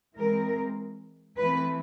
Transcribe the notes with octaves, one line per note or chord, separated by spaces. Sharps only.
E3 G#3 C4 A#4
E3 A3 C4 B4